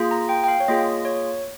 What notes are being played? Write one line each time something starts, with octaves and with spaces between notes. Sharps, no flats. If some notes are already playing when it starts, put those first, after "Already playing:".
Already playing: A#3 F4 G#4
A#5
G5
G5
F5
C#5
A#3 F4 G#4 D#5
C#5